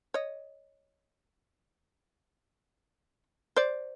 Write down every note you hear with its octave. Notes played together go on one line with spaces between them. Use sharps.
C#5 D#5
C5 D5